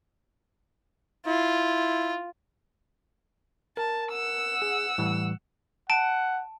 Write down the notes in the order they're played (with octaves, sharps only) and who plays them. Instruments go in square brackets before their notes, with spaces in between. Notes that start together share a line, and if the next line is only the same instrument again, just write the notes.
[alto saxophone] E4 [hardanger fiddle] F4
[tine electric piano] A#4 [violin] A5
[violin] F#5 E6
[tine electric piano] G#4
A2 E3 G3
[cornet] F#5 [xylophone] A5 D7